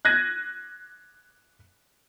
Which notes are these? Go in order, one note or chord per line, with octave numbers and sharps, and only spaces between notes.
F#6 G#6 A#6 D#7